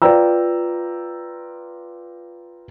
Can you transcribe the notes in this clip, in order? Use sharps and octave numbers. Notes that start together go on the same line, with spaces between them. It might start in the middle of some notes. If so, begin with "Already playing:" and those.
F4 B4 D5 G5 A#5 E6